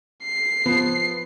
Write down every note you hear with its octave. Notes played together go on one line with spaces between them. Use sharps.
C7
F3 B3